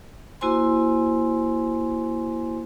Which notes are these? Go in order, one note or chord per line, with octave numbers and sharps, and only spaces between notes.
A#3 E4 F#4 C5 G#5 C6